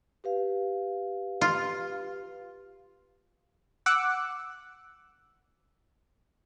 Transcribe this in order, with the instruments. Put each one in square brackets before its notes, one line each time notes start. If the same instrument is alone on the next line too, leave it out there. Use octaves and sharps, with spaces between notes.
[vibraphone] G4 B4 F5
[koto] F4
[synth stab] F#5 D6 E6 F#6